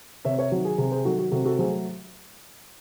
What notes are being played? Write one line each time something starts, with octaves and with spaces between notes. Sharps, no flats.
C3 C#5 E5
C#5 E5
D#3 F#3 F#4
G#4
C3 G#4
G#4 C5
D#3 F#3 F#4 A4
F#4
C3 F#4 A4
F#4 A4
F#3 A3 G#4 C5